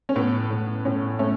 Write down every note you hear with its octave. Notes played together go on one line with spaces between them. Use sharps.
C#4
A2 B3
A2
A2 C#4
A3 C#4